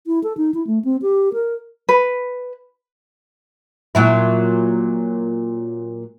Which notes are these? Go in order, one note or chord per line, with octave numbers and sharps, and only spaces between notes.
E4
A4
D#4
E4
A3
C4
G4
A#4
B4
A#2 F#3 E4